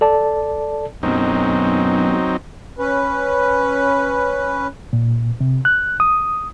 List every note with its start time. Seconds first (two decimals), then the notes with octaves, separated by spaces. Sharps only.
0.01 A4 D5 A5
1.03 F#2 B2 F#3 C4 D#4
2.79 C#4 B4
4.93 A#2
5.41 C3
5.65 F#6
6.00 D#6